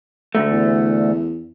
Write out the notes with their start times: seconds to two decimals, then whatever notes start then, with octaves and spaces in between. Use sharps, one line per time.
0.35 D2 G2 A3
0.51 E2